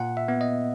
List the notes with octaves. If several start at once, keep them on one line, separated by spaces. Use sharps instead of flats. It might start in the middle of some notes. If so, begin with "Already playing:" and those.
Already playing: A#2 F#5
E5
B3
D#5